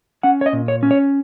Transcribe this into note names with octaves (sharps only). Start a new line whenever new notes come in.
C#4 F#5
C#5
D#5
A#2
C#5
C#4
C#5